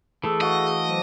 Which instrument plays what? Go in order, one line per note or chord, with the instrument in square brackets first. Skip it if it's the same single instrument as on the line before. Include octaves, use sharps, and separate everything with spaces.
[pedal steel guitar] E3 A3 [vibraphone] G#4 D#6 E6 [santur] A4
[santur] F#4 F5 [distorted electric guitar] D#5
[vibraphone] F#3 C5 D6